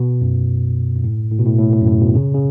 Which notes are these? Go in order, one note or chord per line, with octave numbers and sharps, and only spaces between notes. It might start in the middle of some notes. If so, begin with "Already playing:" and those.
Already playing: B2
F#2
F#2
A2
A2
B2
A2
A2
A2
F#2
A2
B2
C#3
C#3